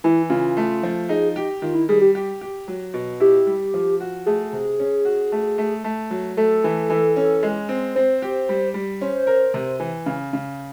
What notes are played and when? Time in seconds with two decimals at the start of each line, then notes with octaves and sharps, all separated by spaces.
0.04 E3 E4
0.30 C#3 F4
0.57 A3
0.83 F3
1.09 D#4 G#4
1.36 G4
1.62 D#3 F4
1.75 E4
1.89 G3 G#4
2.01 G4
2.15 G4
2.41 G4
2.68 F#3
2.94 B2
3.20 E4 G4
3.46 G3
3.74 F3
4.00 F#4
4.26 A3 G#4
4.53 C3
4.80 C#4
5.05 F#4
5.32 A3
5.58 A3
5.84 A3
6.11 F#3
6.37 A3 A4
6.64 E3
6.90 E3
7.16 C#4
7.43 G#3
7.69 C4
7.95 C4 C5
8.22 G4
8.49 G3
8.74 G3
9.01 C#4 C5
9.27 A#4
9.54 C3
9.80 E3
10.06 C#3
10.33 C#3